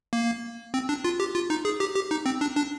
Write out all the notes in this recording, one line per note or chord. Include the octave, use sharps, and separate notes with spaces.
A#3
C4
D4
F4
G4
F4
D#4
G#4
G4
G4
D#4
C4
D4
D4